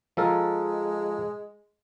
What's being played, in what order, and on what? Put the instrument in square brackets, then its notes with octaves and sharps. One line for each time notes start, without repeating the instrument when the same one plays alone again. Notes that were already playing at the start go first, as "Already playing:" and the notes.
[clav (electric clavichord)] F3 A4 A#4 [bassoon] G#3